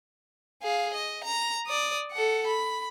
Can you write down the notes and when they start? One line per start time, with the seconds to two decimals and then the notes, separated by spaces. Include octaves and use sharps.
0.63 G#4 F5
0.94 D#5
1.24 A#5
1.67 D5 D#6
2.12 A4 F#5
2.47 B5